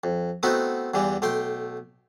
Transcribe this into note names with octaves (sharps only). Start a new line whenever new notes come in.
F2
A3 B3 C4 D#4 E4 F#4
E2 G2 E3 G3
B1 A3 G5 C6